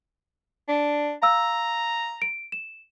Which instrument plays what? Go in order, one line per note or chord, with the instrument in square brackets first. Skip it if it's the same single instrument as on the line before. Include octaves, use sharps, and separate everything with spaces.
[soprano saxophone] D4
[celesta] F5 E6 [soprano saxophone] A#5
[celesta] D7
E7